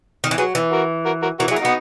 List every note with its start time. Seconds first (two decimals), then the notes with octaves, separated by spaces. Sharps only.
0.24 D#3
0.31 E3
0.38 F#3 G#4 B4
0.55 E3
0.72 F#4 A#4
1.06 F#4 A#4
1.22 F#4 A#4
1.40 E3 F#4 A#4
1.48 F#3
1.51 E4 G#4
1.56 A#3
1.62 B3 D#4 F#4